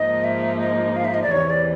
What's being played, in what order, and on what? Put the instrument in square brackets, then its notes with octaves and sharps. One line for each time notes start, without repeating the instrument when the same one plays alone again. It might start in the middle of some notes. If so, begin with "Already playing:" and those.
Already playing: [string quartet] G#2 F3 A#3 D#4 [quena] D#5
[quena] E5
D#5
F5
E5
D#5
D5
[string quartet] E2 C3 E3 [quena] C#5
[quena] D5